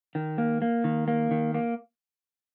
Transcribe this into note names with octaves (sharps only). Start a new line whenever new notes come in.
D#3
A#3
A#3
D#3
A#3
D#3
A#3